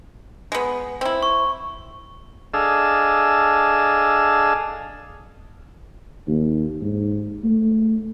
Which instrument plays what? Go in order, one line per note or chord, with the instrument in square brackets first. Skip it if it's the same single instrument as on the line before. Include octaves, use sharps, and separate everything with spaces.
[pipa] G#3 B3
C4 E4
[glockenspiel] C#6
[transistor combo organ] D4 G#4 A4 D#5 F5 E6
[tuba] D#2
G#2
A3